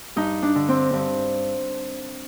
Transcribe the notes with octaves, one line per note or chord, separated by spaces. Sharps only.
G2 D#4
D4
D3
C4
G2 C4